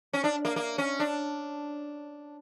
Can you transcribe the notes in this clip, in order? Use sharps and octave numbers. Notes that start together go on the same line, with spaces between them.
C#4
D4
A#3
A#3
C#4
D4